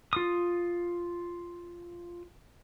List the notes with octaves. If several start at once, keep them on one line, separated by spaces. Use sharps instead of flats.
F4 D#6